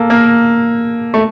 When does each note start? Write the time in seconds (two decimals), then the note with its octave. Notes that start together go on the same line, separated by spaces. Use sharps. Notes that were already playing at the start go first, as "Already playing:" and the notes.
Already playing: A#3 A4
0.10 A#3
1.14 A3